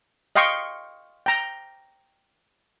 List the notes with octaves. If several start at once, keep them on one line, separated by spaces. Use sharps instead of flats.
D#5 F5 G5 C6 C#6
G5 A#5